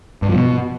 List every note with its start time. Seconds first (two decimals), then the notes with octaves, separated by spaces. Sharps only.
0.22 G2
0.29 F3
0.35 B2